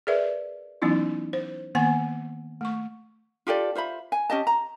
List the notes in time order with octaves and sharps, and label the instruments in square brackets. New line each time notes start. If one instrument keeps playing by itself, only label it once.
[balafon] G#4 A#4 B4 D5 E5
E3 F#3 B3 C#4 D#4 E4
C5
D#3 A#3 B3 F#5 G#5
A3 C#6
[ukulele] F4 G4 A4 D5
F4 C5 E5 B5
G#5
C#4 G4 D#5 A5
A#5